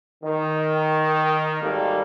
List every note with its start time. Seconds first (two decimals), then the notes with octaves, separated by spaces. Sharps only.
0.24 D#3
1.62 G#1 G3 A#3 D#4 A4